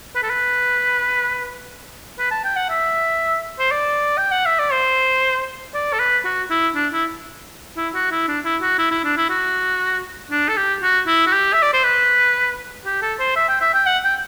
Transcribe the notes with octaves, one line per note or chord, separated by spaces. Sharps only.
B4
A4
B4
B4
A5
G5
F#5
E5
C5
D5
G5
F#5
E5
D5
C5
D5
A4
B4
F#4
E4
D4
E4
E4
F#4
E4
D4
E4
F#4
E4
E4
D4
E4
F#4
D4
A4
G4
F#4
E4
F#4
G4
E5
D5
C5
B4
G4
A4
C5
E5
G5
E5
G5
F#5
G5